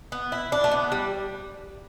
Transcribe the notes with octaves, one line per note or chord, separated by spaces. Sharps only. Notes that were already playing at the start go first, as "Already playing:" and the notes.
B3
E4
D4
A3
B3
G3